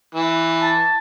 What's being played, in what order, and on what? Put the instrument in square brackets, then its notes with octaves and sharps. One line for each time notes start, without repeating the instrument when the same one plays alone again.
[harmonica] E3
[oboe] A5